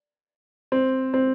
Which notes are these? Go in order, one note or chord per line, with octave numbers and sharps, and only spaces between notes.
C4
C4